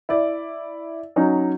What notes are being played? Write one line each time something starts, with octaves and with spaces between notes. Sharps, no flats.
E4 D5
F#3 C#4 D#4